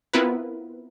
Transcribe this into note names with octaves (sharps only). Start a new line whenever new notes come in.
B3 C4 E4 F4 A#4 B4